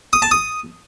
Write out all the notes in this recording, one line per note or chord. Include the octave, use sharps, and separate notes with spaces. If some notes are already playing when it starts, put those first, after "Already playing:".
D#6
A5
D#6